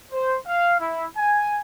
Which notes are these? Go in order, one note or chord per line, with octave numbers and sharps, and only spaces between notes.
C5
F5
E4
G#5